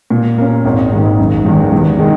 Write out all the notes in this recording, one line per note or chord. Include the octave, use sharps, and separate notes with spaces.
A#2
A#3 C#4
G#1
G#2 D#3
F#1
E2 D#3 G#3
E2
D#3 G#3